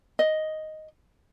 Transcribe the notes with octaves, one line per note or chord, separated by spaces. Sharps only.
D#5